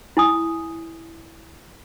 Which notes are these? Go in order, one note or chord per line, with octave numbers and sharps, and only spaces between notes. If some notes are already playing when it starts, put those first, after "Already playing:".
E4 G#5 D#6